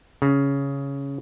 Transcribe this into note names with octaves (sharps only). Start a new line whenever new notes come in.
C#3